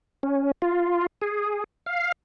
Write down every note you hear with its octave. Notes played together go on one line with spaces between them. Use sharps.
C#4
F4
G#4
F5